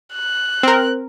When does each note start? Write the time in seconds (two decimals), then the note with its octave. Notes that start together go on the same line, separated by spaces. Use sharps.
0.13 F#6
0.63 C4 A#4